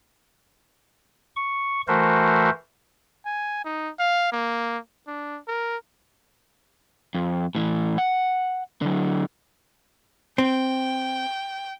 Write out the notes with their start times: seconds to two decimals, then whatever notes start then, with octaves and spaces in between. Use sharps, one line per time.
1.36 C#6
1.88 E3 A3 F#4 A#4 C5
3.26 G#5
3.65 D#4
4.00 F5
4.32 A#3
5.07 D4
5.48 A#4
7.15 F2
7.55 A2 E3
7.98 F#5
8.82 D3 F#3
10.38 C4 G5